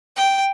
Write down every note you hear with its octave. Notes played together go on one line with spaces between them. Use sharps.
G5